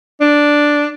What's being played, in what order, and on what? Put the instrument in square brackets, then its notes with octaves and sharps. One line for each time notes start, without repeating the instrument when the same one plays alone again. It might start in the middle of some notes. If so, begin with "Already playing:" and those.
[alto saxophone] D4